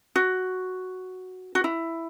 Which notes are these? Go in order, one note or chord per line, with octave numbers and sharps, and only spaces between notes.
F#4
F#4
E4